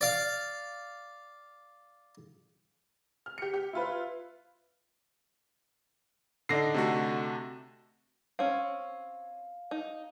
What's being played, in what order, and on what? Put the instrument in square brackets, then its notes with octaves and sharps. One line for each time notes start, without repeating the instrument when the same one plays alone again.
[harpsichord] D5 F5
[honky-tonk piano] F6
G4 C#7
G4
E4 F4 B4
[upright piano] D3 D4 D#4 [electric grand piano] A#6 C7
[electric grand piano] C3 A3 F#4
[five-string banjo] C4 C#4 [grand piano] F5
[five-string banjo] D#4